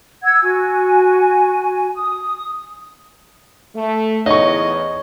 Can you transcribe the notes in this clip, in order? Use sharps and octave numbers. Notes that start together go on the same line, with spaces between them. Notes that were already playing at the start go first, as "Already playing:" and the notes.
F#5 E6 G#6
F#4 G#5
D#6
A3
E2 D#4 C#5 D#5 C#6